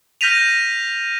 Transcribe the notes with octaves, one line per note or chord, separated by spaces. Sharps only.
F6 G6 A#6 B6 D#7 F7